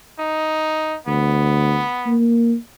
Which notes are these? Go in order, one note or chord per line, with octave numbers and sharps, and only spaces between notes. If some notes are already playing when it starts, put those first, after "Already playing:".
D#4
D2 B3
A#3